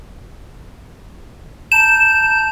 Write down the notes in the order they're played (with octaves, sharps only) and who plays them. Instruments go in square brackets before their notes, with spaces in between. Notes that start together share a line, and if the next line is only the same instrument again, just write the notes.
[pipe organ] A5 A#5 G6 [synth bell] E7